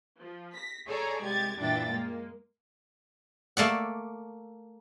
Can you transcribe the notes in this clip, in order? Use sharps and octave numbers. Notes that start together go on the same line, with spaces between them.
F3
A#6 B6
G#4 A4 C#5 D5 G#5 A#5
C2 G#3 G4 G#6 A6
F#2 A#2 E3 D4 G5 A6
G#3 A#3
A3 A#3 D5 F#5